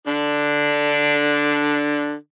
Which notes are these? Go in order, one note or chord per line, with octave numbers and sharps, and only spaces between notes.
D3 D4